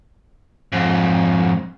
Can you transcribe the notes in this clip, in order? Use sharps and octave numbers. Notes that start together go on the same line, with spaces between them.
F2 G#2